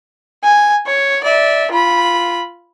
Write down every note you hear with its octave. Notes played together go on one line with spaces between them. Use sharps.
G#5
C#5
D5 E5
F4 B5